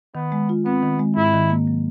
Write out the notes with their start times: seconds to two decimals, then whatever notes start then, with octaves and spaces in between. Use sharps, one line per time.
0.15 D#3 B3
0.32 G#3
0.49 F4
0.65 B3 C4
0.83 D#3
0.99 G#3
1.17 G#2 E4
1.34 D#3
1.50 A#3
1.67 F#3